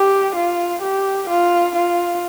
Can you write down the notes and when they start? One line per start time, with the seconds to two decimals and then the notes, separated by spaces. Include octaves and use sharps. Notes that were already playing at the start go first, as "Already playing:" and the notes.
Already playing: G4
0.36 F4
0.82 G4
1.29 F4
1.76 F4